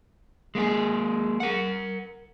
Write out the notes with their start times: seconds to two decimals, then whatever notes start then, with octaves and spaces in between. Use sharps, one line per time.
0.55 G#3 A#3 E4 G#4
1.40 A#4 F#5